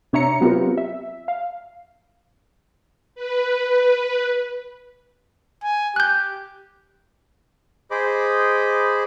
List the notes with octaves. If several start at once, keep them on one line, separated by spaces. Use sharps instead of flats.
C3 D4 C#5 E5 A#5 C#7
F#3 B3 C4 F4 G4 A#4
E5
F5
B4
G#5
G4 F#6 G6
G#4 C5 D#5 B5 D6